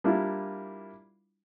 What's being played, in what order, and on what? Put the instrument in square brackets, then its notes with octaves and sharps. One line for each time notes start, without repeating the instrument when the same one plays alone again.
[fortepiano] G3 A#3 D4 E4 F4